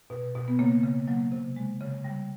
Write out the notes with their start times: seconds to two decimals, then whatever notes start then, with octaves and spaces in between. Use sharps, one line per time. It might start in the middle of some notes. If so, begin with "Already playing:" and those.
0.10 B2
0.35 B2
0.48 B3
0.59 C#3 A#3
0.83 C#3
1.08 F#3 A#3
1.32 C3
1.56 G#3
1.81 C#3
2.04 G3